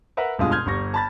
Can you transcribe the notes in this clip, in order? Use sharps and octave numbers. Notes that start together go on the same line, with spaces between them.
A#4 B4 E5 F#5
F1 G2 B2 G#3 F4 D#6
C6 D#6 F6 G6 G#6
G1 G3 C#6 A#6
A5 B5 A6